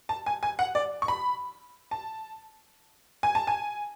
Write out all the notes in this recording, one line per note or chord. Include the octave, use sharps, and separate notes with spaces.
A5
G#5
G#5
F#5
D5
C#6
B5
A5
G#5
A5
G#5